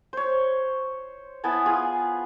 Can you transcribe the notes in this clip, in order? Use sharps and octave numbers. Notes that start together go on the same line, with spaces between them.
C5 C#5
B3 E4 G#5 A5
F4 G#4